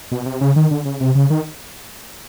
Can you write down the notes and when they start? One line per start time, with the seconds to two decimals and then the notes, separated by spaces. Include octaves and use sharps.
0.12 B2
0.26 C3
0.41 C#3
0.56 D#3
0.71 D3
0.85 C#3
1.00 C3
1.15 C#3
1.30 D#3